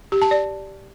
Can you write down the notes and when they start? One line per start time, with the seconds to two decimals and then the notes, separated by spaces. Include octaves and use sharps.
0.12 G4
0.22 A5
0.31 D5